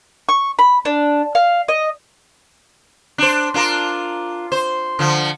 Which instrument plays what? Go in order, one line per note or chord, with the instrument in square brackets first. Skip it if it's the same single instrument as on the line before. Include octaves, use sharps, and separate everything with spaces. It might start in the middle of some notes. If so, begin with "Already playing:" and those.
[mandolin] C#6
B5
D4
F5
D#5
[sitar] D4 C5
D4 F4 A#4
C5
D3 F3